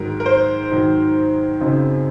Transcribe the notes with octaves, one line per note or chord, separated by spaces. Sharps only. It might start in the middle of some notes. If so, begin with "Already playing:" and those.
Already playing: G#2 D#3 F#3 A#4
A#4
C5
G#2 D#3 F#3
F#2 C#3 F#3 C4 D#4